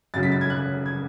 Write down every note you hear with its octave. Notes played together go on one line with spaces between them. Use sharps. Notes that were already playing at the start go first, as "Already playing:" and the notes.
F#2 C#3 F#3 A6
B6
A6
G#6
F#6
G#6